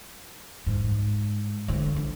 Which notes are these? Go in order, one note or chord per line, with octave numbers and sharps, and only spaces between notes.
G#2
D2
D3